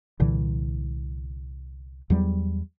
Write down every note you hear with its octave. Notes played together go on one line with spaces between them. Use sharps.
C2 A#2 D3 E3
E2 F#3 G3